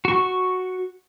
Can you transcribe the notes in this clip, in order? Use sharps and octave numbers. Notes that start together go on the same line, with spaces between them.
F#4 C#6